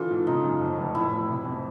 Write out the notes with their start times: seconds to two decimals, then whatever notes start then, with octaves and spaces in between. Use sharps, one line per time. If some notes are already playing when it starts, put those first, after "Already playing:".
Already playing: D3 E3 F4 A4
0.11 G#2
0.27 C#3 D#4
0.44 F#2
0.61 F2
0.78 F1
0.95 A2 E4
1.12 B1
1.28 C3
1.45 F2